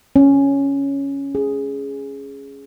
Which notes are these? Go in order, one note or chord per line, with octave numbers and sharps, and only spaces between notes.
C#4
G#4